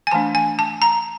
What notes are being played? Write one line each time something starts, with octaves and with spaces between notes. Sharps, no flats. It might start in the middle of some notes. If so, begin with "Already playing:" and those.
G#5
E3 A3 D4 A5
G#5
A5
A#5